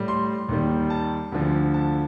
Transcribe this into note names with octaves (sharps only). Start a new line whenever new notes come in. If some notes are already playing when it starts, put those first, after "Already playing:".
Already playing: A2 G3
C6
D#2 D#3 G3
A5
D2 D3 F3
A5